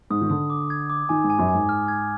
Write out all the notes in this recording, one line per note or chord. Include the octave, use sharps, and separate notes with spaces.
G#2 D#6
D#3
D3 D#6
D6
G#6
D6
D#3 G#5
G#2
G#5
F#2
G#5
G#2
F6
G#6